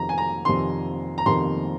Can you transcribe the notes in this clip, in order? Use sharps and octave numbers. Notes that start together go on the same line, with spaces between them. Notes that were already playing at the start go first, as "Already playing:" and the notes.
Already playing: F2 C3 D#3 A#5
G#5
A#5
F2 C3 D#3 C6
A#5
F2 C3 D#3 C6